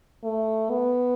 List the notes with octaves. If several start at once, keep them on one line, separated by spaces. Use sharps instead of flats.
A3
B3